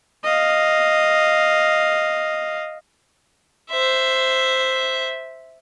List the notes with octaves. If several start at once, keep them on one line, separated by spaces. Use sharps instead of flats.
D#5 F5
C5 E5